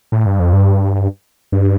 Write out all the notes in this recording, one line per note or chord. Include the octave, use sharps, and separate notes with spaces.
A2
G2
F2
G2
G2